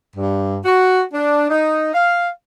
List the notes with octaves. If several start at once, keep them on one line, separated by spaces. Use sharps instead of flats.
G2
F#4
D4
D#4
F5